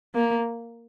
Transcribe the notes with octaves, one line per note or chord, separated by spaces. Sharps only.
A#3